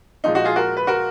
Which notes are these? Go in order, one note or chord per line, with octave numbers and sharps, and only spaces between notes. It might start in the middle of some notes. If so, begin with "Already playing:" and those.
A#2 F3 G#3 D#4
D#4 F#4
F4 G#4
F#4 A#4
B4
F#4 A#4